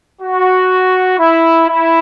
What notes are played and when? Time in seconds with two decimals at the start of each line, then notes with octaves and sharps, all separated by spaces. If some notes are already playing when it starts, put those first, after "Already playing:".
0.21 F#4
1.19 E4
1.68 E4